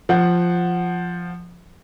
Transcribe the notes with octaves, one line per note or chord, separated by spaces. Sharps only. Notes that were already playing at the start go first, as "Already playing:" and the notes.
F3 F#5